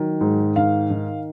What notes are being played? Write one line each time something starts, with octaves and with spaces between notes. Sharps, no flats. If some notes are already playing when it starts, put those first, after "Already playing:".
Already playing: D#3 F#3
G#2
D#3 F5
D#3